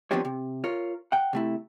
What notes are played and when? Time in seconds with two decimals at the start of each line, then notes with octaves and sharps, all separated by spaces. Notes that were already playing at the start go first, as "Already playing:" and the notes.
0.11 F3 B3 C4 D4 G4 C#5
0.25 C3
0.64 F4 A#4 C#5
1.12 F#5 G5
1.33 C3 A3 E4